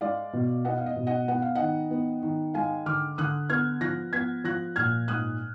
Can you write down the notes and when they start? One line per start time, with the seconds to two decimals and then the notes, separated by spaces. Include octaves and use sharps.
0.01 G#3 D5 F5
0.33 B2
0.65 B3 D#5 F#5
0.77 F5
0.86 D#5
0.96 B2
1.07 D#5 F#5
1.28 B3 F#5
1.42 F5
1.55 D#3 D#5 F#5
1.91 B3
2.23 D#3
2.54 G#3 F5 G#5
2.86 D3 D6 F6
3.18 D3 D#6 F#6
3.50 B3 F6 G#6
3.81 F3 F#6 A#6
4.13 B3 G#6 B6
4.44 F3 F#6 A#6
4.76 A#2 F6 G#6
5.08 G#2 D#6 F#6